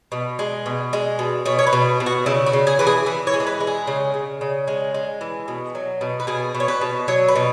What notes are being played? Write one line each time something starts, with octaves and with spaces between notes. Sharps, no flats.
B2
G#3
B2
G#3
B2
B2 C#5
C#5
B4
B2
B2
F#4
C#3 E4
F#4
C#3
G#4
E3 B4
G#4
E3 B4
C#5
G#3
G#4
B4
G#3
G#4
C#3
C#3
C#3
G#3
G#3
E3
B2
F#3
B2
B4
B2 G#4
B2
C#5
B4
B2
F#3 C#5
B4
B2